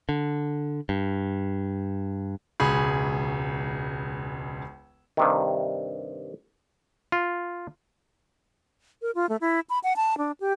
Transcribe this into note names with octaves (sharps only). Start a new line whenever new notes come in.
D3
G2
E1 C#2 G#4 B5
G2 C3 D#3
F4
A#4
F4
A3
E4
B5
F#5
A5
D4
G4